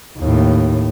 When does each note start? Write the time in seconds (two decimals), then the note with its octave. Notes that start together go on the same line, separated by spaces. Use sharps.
0.19 D#2 A2